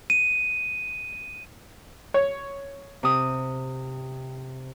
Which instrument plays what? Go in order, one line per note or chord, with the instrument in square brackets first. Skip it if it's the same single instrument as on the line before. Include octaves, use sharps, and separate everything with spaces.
[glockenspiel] D#7
[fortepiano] C#5
[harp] C3 D#6